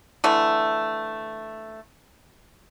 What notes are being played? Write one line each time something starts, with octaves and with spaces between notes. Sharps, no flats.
D3 E3 A3